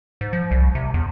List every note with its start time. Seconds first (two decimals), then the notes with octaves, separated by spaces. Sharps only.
0.21 G#2
0.33 F3
0.51 C2
0.75 C3
0.94 E2